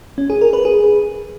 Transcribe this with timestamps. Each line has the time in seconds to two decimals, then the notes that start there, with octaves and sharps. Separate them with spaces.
0.18 C#4
0.30 G#4
0.41 A#4
0.53 B4
0.65 G#4